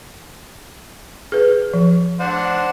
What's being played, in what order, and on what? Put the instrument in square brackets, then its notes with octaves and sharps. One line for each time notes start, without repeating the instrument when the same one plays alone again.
[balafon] G#4 B4
F3
[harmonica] D4 C5 F#5